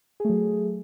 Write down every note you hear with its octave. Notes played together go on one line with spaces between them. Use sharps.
F#3 A3 G#4